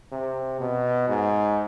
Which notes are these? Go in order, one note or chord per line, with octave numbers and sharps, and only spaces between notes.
C3
B2
G#2